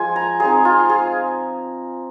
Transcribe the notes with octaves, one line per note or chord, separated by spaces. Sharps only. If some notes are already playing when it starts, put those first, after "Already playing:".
Already playing: F3 G#3 F4 G#5
A#5
F3 G#3 C4 D#4 G#4
F4
G#4